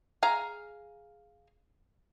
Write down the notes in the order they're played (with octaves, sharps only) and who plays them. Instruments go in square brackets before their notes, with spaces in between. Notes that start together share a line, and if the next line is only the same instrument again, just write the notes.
[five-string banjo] G#4 F5 G#5 A#5